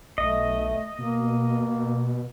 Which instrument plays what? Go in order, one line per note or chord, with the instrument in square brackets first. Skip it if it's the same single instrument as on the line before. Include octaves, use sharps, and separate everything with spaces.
[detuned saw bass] B1 [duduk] A3 [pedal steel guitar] D#5
[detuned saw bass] B2 [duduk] A#3